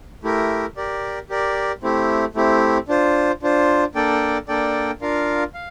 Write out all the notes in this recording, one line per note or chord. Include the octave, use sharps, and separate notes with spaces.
A3 E4 G4 A#4
G4 A#4 D5
G4 A#4 D5
A3 C4 E4 G4
A3 C4 E4 G4
D4 F4 C5
D4 F4 C5
A#3 D4 A4 D5 G5
A#3 D4 A4 D5 G5
D4 F4 A#4 F5
F5